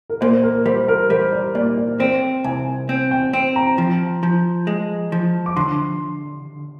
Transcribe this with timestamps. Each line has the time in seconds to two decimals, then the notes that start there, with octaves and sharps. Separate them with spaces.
0.10 A#4
0.21 A#2 C5
0.43 A#4
0.66 G3 C5
0.88 A#4
1.10 G3 C5
1.33 D5
1.55 A#2 D5
1.77 D5
2.00 C4 C5
2.44 C2 G#5
2.89 C4
3.11 G5
3.33 C4
3.56 A#5
3.78 F3
4.23 F3
4.67 G#3
5.12 F3
5.46 D6
5.56 D3 C6